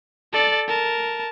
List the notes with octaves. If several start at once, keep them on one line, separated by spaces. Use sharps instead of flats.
A4 D5
A#4 A5